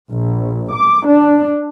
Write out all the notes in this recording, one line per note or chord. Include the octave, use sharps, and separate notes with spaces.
A#1
D6
D4